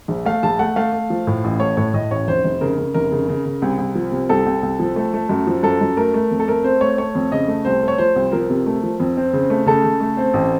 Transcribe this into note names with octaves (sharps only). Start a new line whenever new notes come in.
A#1
A3 F5
A#1 A5
A3 F#5
A3 F5
A3
F3
A2
A1
A3 C#5
A2 C#5
A2 D#5
A1 C#5
F1 C5
F1
C#3 A#4
C#3
F1 A#4
C#3
C#3
C#3
C2
C2
F3
C3
C2 A4
C2
C2
F3
A3
A3
F#2
F3
F#2 A4
F#2
A3 A#4
A3
F2
A4
A3 A#4
C4 C5
A3 C#5
A3 C#5
F2
C#3 D#5
A3
C2 C5
A3
C#5
F3 C5
C2
F3 A#4
C3
A3
F3
F2
C4
C#3
A3
C#3 A4
C#3
A3
C4
A1